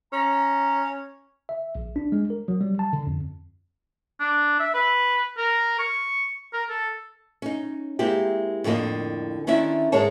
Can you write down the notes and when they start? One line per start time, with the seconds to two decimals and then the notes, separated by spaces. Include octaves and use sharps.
0.13 C#4 A#5
1.49 E5
1.75 A#1
1.96 D4
2.12 G#3
2.30 A#4
2.48 F#3
2.61 G3
2.79 A5
2.93 D3
3.07 F2
4.20 D4
4.60 E5
4.74 B4
5.38 A#4
5.79 C#6
6.53 A#4
6.70 A4
7.42 C#4 D#4
7.99 G#3 A#3 C4 E4 G4
8.64 F2 A2 D3 A#3 D#5
9.47 D3 D#3 C#4 D4 E4 E5
9.92 G#2 G#3 A#4 C#5 A5